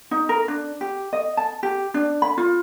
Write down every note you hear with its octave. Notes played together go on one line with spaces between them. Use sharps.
D#4
A#4
D4
G4
D#5
A5
G4
D4
B5
F4